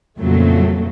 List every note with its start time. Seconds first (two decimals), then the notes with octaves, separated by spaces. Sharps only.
0.19 F2 A#2 C#3 F#3 A3